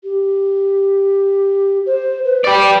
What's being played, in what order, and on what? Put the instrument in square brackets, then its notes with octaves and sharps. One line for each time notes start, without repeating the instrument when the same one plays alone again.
[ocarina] G4
C5
B4
[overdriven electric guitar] G4 D5